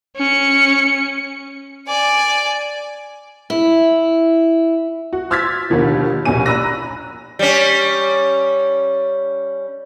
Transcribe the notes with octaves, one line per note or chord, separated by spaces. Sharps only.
C#4 C#7
D5 G#5
E4
F#4
C6 E6 F6 G#6 A6 B6
D#2 B2 D3 D#3 F3
A#1 D#2 B2 C#4 G#5 D#7
D5 A#5 B5 E6 F#6 A#6
G3 C#4